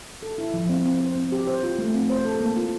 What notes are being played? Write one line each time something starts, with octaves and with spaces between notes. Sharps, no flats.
A4
E4
F3
C4
C4
C5
C4
G4
C5
F4
A3
C4
C5
A4
A#3
F4